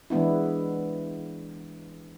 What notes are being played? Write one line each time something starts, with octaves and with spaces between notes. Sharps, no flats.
E3 G#3 B3 D4 E4